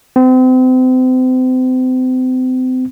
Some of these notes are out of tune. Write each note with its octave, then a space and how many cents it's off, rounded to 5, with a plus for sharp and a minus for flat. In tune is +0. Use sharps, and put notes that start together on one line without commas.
C4 -35